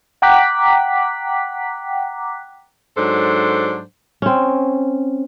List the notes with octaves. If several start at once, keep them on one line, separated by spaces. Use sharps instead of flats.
F#5 G5 A#5 D6 F#6 B6
G#2 F#3 D4 A4 C5
C4 C#4